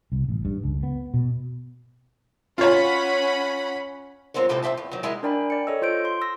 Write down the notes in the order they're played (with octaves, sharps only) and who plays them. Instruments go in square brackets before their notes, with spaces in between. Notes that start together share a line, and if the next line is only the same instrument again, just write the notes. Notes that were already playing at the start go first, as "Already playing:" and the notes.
[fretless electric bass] C2
A1
G2
C#2
B3
B2
[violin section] C#4 F#5 B5 [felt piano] F4 C#5
[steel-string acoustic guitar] G#3 C4 F4 A#4 C#5
A2 C3 G#3 F4 A4 C5
F2 E3 C4 E5 A5
E2
D#3 F#3
G#3 E4 A#4 D#5
[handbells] D4 A#4 D5 G5 G#5 B5
D5 C#7
A4 C#5 D#5 E6
F4 C5 G6 D7
C6
E6 A#6